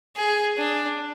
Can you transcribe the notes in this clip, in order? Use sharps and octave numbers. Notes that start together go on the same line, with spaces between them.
G#4
D4